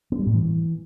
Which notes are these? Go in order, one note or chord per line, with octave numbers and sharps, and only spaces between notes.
B3
G3
A2
E3